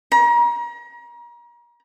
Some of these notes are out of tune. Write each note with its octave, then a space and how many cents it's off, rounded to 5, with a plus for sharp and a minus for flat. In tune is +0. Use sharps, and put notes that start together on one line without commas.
A#5 +35